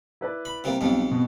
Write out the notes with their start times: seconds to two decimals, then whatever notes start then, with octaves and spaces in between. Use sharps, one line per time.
0.21 E4 B4 D5
0.45 B5
0.64 C3 G3 A#3
0.81 B1 F2 G3
1.11 B2